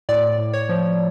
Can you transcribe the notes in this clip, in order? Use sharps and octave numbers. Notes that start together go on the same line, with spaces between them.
A2 D5
A2
C#5
F3